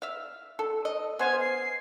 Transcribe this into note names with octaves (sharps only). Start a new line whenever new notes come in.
E5 F5
A4
D#5
B3 C5 F5 G#5
C7